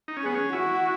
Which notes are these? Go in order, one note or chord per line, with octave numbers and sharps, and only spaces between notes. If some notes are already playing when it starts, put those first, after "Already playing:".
D#4
C#4
B3 G#4
C#4
E4 F#4